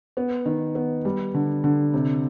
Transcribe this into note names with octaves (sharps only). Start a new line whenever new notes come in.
B3
D#3
B3
G3
D3
D3
C3